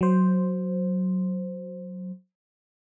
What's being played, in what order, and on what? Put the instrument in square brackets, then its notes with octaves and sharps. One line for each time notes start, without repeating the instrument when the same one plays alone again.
[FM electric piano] F#3 C5